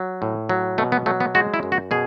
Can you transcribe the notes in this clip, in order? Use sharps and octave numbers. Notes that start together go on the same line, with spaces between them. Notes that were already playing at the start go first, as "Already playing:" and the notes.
Already playing: F#3
A2
F#3
B2 A3
B3
F#3 A3
B3
G#3 F#4
E4
F#2
F#4
B2 G#4